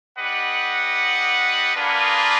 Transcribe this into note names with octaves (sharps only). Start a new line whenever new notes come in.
D4 G4 B4 D#5 F#5
A#3 D4 F4 G#4 B4